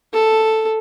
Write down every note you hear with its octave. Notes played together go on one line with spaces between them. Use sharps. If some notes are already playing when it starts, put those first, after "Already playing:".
A4